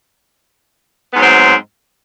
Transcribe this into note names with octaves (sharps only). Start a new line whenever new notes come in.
G#2 F#3 B3 C4